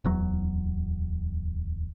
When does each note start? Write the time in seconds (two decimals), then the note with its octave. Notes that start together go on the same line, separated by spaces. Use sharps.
0.04 D1 E2 F#3